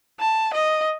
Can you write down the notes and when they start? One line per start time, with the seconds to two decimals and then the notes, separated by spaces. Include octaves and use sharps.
0.20 A5
0.54 D#5